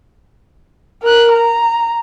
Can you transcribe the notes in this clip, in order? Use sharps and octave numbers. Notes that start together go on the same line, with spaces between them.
A#4 F#6
A#5